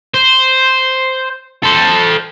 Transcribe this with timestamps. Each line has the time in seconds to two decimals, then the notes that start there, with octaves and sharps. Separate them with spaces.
0.14 C5
1.63 A4 C5